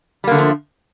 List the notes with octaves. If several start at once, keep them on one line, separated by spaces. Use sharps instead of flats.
D3 F3 G3 A3 A#3